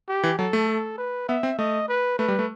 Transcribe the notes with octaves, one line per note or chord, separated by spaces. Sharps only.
G4
E3
F#3 A4
A3
A4
B4
B3 E5
C4
A3 D#5
B4
A3 B4
G3
A3